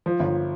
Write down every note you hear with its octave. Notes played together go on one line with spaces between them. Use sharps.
F3
G1